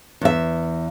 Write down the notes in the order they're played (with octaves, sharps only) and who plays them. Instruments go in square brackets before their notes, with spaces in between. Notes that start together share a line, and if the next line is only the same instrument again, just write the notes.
[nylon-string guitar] E2 E5